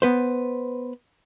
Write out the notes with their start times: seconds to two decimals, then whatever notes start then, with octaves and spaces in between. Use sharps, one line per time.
0.02 B3 B4 C5